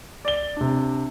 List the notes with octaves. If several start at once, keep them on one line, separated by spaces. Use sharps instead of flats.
D5 G7
C3 D4